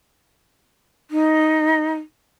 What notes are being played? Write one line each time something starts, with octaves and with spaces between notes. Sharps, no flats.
D#4